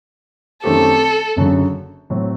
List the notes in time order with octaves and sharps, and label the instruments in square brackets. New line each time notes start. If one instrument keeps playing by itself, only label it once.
[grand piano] F#2 D#3 A3 C4 G4 [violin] A4
[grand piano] F#1 F#2 D3 F#3
A2 F#3 C4